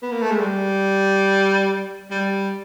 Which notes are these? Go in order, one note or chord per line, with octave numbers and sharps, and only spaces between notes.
B3
A#3
A3
G#3
G3
G3